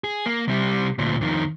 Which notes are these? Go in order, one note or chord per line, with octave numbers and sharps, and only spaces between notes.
G#4
A#3
C3 G3
D2 A#2
F2 D#3